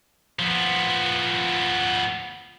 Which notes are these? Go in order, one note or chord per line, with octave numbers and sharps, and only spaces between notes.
F3 B3